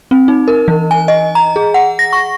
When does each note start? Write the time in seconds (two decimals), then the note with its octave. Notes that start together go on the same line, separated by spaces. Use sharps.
0.11 C4
0.28 D#4
0.48 A#4
0.68 E3
0.91 G#5
1.08 D#5
1.35 A#5
1.56 G#4
1.74 F#5
1.99 A#6
2.13 C#6